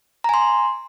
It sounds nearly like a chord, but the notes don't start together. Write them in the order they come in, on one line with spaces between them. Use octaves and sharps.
A#5 G#5 C6